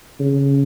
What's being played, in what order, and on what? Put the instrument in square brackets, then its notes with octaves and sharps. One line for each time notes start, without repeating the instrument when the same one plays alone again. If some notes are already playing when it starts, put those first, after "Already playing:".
[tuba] C#3